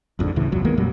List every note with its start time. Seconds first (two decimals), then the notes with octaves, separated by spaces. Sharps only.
0.19 G#1 F2 G#2 D3
0.36 D2 A2 C#3 E3
0.52 G1 C2 F2 F#3
0.65 D#3 G#3 A#3 B3
0.77 F2 A#2 F#3 G3